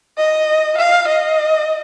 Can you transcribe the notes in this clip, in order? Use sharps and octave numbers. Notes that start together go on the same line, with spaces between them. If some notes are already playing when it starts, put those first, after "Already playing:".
D#5
F5
D#5